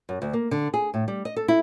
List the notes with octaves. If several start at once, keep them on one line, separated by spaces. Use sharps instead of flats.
F#2
D2
A#3
D3
G#4
A2
G3
D#5
A4
E4